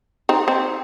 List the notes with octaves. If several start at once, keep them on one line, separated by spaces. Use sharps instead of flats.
C4 D#4
C4